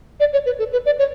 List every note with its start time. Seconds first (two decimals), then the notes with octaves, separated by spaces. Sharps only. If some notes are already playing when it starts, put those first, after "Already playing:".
0.20 D5
0.33 C#5
0.46 B4
0.59 A4
0.72 B4
0.86 D5
0.99 C#5